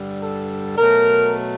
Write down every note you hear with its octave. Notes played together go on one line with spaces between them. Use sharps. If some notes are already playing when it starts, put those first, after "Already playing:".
Already playing: G2 D3 G3
A4
B2 F#3 A3 A#4